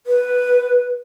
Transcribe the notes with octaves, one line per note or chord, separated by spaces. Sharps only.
B4